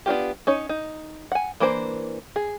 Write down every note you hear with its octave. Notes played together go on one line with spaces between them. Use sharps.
B3 D4 F4 G4
C#4 D#4 C#5
D#4
F#5 G#5
E3 A#3 D4 C5
G#4